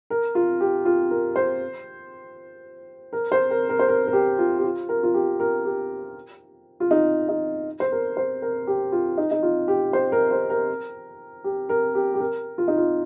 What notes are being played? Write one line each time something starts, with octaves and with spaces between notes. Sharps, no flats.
A#4
F4
G4
F4
A#4
C5
A#4
C5
A#4
A#4
C5
A#4
A#4
G4
F4
G4
F4
A#4
F4
G4
A#4
G4
F4
D#4
D#4
C5
A#4
C5
A#4
G4
F4
D#4
D#4
F4
G4
C5
A#4
C5
A#4
G4
A#4
G4
G4
A#4
F4
D#4
F4